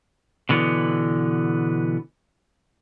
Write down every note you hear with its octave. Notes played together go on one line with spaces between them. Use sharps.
B2 D3 E3 B3